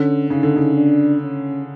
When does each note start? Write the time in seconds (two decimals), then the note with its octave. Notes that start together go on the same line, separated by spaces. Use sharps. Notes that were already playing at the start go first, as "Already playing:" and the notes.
Already playing: D3 C#4
0.30 C#3 D#4
0.43 D3
0.56 C#3
0.76 D4
1.22 C#4